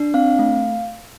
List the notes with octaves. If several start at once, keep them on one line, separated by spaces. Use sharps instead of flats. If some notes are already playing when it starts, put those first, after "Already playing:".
Already playing: D4
C4 F5
A3